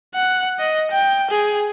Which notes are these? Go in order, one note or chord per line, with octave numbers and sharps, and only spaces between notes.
F#5
D#5
G5
G#4